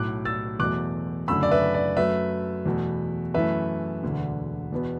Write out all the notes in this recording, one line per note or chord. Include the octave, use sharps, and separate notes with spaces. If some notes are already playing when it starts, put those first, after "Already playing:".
Already playing: B1 A2 F#3 D6 F#6
E6 A6
E2 B2 F#3 A3 D6 F#6
F#1 F#2 D3 A3 B5 E6
D5
B4 E5
D5
F#2 F#3 A3 B4 E5
E2 B2 A3
F#2 E3 A3 B4 E5
E1 D2 D3
E2 B2 B3